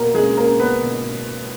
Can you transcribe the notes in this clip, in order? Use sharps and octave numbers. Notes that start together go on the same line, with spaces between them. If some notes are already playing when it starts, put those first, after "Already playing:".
Already playing: B2 A#3 A#4
G#3 G#4
A#3 A#4
B3 B4
B2